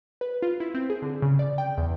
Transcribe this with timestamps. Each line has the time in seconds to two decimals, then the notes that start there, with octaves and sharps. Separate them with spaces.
0.21 B4
0.42 F4
0.60 E4
0.74 C4
0.90 G#4
1.02 D3
1.22 C#3
1.39 D5
1.58 G5
1.78 E2